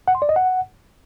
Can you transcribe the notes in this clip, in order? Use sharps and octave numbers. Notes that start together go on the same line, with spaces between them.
F#5
C6
D5
D#5
F#5